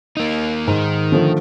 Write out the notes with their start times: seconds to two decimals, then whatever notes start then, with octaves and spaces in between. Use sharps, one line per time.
0.17 A#3 D#4
0.67 G#2 D#3
1.12 D3 F3 A3